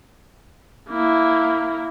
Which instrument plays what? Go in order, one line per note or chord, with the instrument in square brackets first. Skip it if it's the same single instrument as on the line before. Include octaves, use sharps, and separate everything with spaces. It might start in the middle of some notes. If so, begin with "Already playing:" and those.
[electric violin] A#3 E4